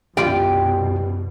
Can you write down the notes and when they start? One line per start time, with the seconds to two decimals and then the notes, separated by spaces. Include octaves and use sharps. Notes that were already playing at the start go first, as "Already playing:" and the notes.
0.17 C2 F#2 B2 F4 G4 D5 G5